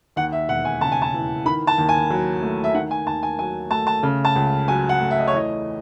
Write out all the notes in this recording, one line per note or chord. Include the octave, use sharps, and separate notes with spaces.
D#2 F#5
E5
E1 F#5
G#5
C#3 A5
G#5
A5
E3
D#3 B5
A5
D#2
G#5
F#3
A3
E5
D#3 F#5
G#5
D#2 A5
G#5
F#3 G#5
A3 A5
A5
C#3
A5
C#2
F#3 G#5
F#5
A3
E5
D#5
C#5
E2 D#5